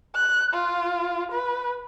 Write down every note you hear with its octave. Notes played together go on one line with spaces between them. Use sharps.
F#6
F4
B4